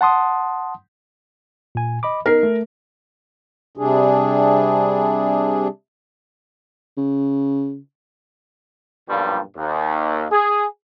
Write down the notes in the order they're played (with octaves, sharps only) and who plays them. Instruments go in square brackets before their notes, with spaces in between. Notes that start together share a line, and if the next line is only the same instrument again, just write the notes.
[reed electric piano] F#5 A5 C6 D#6
[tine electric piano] A#2 G#5
D#5 B5 D6
[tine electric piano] B3 D#4 C7 [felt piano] A#4
[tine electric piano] A3
[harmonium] C3 G3 D4 G#4
[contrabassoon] C#3
[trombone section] B1 G2 A#2 F3 G3 A#3
D#2
G#4